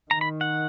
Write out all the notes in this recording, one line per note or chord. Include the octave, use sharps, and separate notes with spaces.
D#3 A#5
B5
F#5